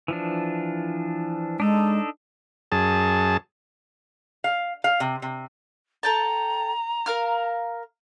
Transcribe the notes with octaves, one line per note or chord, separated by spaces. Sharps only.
E3 F3 D4
G#3 D4 D#4 A4
F#2 G#4 A5
F5
F5
C3
C3
A4 G5 A5 A#5
A#4 F5 F6